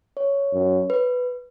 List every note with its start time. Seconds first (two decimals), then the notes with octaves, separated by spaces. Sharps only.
0.17 C#5
0.53 F#2
0.90 B4